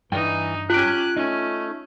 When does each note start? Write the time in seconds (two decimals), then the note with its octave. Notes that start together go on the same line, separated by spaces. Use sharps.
0.12 G2 E3 D#4 G5
0.70 C#4 F4 G4 F#6 D7
1.17 A3 C#4 D#4